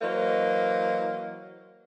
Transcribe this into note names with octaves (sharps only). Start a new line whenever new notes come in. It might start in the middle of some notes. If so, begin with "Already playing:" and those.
E3 F#3 A#3 C5 D#5